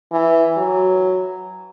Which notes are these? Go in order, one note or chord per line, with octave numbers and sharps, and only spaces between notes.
E3
F#3